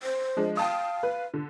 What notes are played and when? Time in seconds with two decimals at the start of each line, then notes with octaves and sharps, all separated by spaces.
0.03 C5
0.37 F3 G#3 D4
0.57 F5 G5 A5 D#6
1.03 B4
1.34 D3